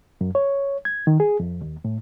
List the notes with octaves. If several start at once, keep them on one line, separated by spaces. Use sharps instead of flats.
F#2
C#5
G#6
D#3
G#4
F2
D#2
A2